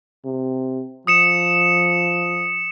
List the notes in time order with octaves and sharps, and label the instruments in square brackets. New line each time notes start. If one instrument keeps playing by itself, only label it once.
[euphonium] C3
[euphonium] F3 [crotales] D#6 C#7 E7